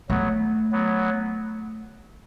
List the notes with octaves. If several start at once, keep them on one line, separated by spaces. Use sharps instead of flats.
F#3 A3 B3
F#3 B3